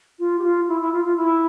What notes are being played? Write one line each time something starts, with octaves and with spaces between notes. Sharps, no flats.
F4
G4
F4
E4
E4
F4
F4
E4